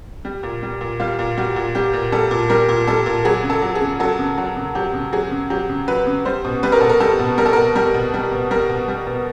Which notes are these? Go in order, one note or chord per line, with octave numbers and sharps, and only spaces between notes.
G3
A#2
G3
A#2
G3 F4
A#2
G3 F#4
A#2
G3 G4
A#2
G3 A4
A#2
G3 A#4
A#2
G3 A4
A#2
F#3 G#4
C#3
A4
F#3
G#4
C#3
F#3 A4
C#3
F#3
C#3
F#3 G4
C#3
F#3 G#4
C#3
F#3 G4
C#3
F#3 B4
C#3
G3 C5
B2
G3 B4
A#4
B2 A4
A#4
G3 A4
B2
G3 A#4
A4
B2 A#4
G3 A#4
B2
G3
B2
G3 A#4
B2
G3
B2